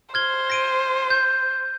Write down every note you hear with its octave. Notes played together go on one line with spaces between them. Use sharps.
C5 F6 G#6 G7
A#6 D7 D#7
G6